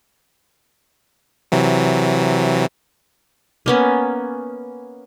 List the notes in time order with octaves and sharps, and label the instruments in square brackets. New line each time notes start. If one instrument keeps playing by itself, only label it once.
[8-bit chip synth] C3 E3 F#3
[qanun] A#3 B3 C#4